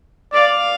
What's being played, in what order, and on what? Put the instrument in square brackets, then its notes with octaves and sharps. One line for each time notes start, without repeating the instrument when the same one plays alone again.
[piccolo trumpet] D5 [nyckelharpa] F5